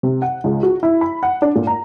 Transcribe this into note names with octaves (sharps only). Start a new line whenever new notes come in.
C3
F#5
C#2
F#4
E4
B5
F#5
D4
A#2
A#5